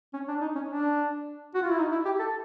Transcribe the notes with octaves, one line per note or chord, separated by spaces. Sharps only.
C#4
D4
D#4
C#4
D4
F#4
F4
E4
D#4
E4
G4
A4